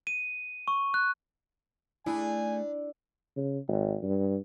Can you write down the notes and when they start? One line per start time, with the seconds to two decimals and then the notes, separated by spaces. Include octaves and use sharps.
0.07 D#7
0.68 C#6
0.94 F#6
2.06 A3 D4 E4 G#4 G#5
3.37 C#3
3.68 G#1
4.03 G2